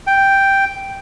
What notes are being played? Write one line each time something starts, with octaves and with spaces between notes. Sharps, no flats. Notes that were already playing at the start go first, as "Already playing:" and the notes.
G5